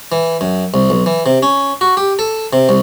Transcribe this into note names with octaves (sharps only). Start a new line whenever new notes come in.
E3
F#2
C2
B1
E3
C3
C#4
F#4
G4
A4
C3
C2